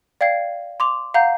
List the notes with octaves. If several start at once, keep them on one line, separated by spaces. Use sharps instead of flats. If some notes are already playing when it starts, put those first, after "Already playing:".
D5 F5 G5 G#6 C7
C6 D6 F7
F5 F#5 A#5 G6 C7